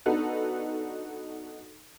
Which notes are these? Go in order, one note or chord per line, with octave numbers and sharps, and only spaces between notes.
B3 D4 D#4 F#4 A4 B4